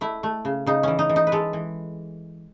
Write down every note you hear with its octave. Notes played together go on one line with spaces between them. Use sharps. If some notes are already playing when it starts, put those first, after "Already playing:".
A3 E4
A3
C#3
C#3 D#4
E3 C#4
D#4
E3
D#4
B4
G#3 A4
E3